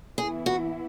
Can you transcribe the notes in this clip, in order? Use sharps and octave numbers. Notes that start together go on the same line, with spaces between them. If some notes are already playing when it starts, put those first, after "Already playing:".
E3 B3 E4 G#4
F#4